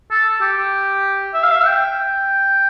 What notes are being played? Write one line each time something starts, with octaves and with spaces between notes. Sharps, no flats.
A4
G4
E5
F5
E5
G5